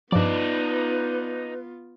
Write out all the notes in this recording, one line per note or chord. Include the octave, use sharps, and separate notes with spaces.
G2 F3 B3 D#4 F4 B4 D5